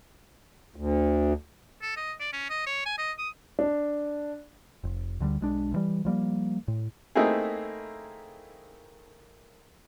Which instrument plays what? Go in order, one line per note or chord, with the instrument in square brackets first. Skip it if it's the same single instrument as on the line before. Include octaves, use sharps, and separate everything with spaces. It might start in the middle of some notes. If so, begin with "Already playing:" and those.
[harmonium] D2
[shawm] A4
D#5
D5
C#4
D#5
C#5
G#5
D#5
D#6
[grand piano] D4
[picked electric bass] F1
D2 D3 F3 G3
B1 G#3 D4
D2 E3 G3
F3 G3 A#3
A2
[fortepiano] A3 A#3 C4 D#4 E4 G#4